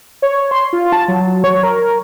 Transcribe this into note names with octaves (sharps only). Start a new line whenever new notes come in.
C#5
C6
F4
A5
F#3
C#5
A#4